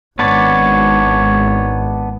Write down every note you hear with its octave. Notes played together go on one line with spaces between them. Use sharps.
G#1 B3 D4 C#5 D5